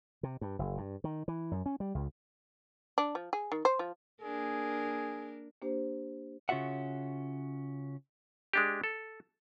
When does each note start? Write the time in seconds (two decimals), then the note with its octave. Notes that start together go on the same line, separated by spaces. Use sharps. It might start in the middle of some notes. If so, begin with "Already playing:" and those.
0.23 C3
0.41 G2
0.59 F#1
0.78 G2
1.04 D#3
1.28 E3
1.51 F#2
1.66 C#4
1.80 G3
1.95 C#2
2.98 D4
3.15 F3
3.33 G#4
3.52 D#3
3.65 C5
3.79 F3
4.22 A#3 D4 G#4 A#4
5.62 A#3 D4 G4 C5
6.49 C#3 C#4 F4 F#4 E5 F#5
8.53 G#3 D4 G4
8.84 A4